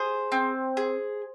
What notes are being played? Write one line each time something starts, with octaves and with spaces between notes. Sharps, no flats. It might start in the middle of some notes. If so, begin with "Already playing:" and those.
Already playing: G#4 C5
C4
G#4